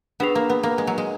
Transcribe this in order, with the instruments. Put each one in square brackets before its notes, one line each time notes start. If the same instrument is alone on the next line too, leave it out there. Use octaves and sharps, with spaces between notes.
[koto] B3 [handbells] D4 G#4 B4
[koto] A#3
B3
A#3
G#3
F#3
G#3